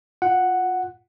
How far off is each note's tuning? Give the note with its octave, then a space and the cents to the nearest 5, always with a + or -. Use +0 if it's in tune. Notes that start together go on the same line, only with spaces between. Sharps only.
F4 +15 F#5 +0